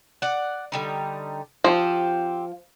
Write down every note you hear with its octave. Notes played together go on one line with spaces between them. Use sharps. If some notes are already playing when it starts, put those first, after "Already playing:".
D5 F#5
D3 G3 D#4
F3 C4 G4